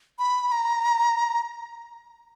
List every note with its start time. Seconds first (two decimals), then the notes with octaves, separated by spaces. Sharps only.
0.19 B5
0.52 A#5